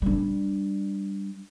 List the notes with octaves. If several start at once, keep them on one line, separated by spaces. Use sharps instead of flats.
G3 D4